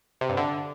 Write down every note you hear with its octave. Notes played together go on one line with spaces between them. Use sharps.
C3
G2
D3